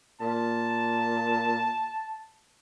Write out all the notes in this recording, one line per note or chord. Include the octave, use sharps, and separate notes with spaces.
A#2 A5